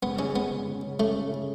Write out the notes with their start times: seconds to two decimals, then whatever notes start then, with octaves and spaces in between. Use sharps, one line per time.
0.03 C#3 B3
0.19 G#3 C#4
0.35 C#3 B3
0.51 C#3
0.67 C#3
0.83 C#4
0.99 C#3 A3
1.16 C#4
1.31 C#3